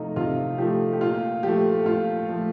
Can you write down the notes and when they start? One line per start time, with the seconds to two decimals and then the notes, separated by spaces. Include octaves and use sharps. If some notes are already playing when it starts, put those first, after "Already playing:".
Already playing: C3 F3 A3 D#4 F4
0.16 C3 F4
0.58 F3 A3 G4
0.93 G4
1.01 A#2 F4
1.43 F3 A3 G4
1.86 A#2 F4
2.29 F3 A3